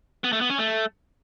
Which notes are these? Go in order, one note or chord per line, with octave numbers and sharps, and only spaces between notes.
B3
A3
B3
C#4
A3